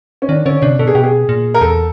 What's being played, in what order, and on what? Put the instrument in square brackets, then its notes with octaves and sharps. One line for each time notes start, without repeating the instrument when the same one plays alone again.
[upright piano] C#4
[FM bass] D#3 [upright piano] D4
[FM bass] D3 [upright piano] C#4
[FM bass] C3 [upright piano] D4
[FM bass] B2 [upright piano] A4
[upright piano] G#4
[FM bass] B2 [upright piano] G4
[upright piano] G#4
[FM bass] A#2
[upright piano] A#4
[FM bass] E2 [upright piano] A4